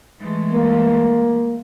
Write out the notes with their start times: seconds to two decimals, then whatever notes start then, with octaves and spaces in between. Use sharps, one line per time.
0.21 E3 G#3 A3
0.53 A#3